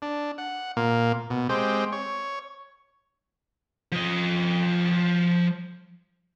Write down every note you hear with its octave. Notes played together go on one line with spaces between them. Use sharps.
D4
F#5
A#2 A#3
B2
G#3 C4 G4
C#5
F3 D#5